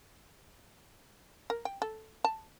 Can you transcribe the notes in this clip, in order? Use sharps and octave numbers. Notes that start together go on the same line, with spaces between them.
A#4
G5
A4
A5